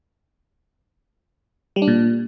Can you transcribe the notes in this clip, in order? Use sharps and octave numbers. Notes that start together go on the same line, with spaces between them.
G3
D4
A#2